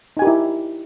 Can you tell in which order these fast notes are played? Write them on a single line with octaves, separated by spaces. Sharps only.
D#4 G#5 G4 A#4 E4